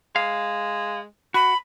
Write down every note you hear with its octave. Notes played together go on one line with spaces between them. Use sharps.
G#3 F5
F#4 B5